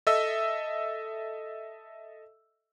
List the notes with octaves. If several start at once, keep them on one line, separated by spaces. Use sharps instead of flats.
A4 D#5 E5 E6